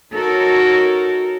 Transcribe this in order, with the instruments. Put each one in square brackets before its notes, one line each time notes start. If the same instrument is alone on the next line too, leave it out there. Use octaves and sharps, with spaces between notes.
[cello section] D#4 F#4 A4 A#4 C#5